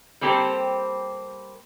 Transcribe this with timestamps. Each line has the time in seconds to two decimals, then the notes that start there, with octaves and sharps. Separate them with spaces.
0.21 G3 A#3 C4 G4 A4 C5